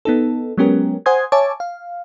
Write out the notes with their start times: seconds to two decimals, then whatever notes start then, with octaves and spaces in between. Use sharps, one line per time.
0.05 B3 D#4 A4
0.58 F#3 G#3 B3 C#4 G4 A#4
1.06 C5 F#5 G#5 C6 D#6 G#6
1.32 C#5 E5 G#5 A5 D6
1.60 F5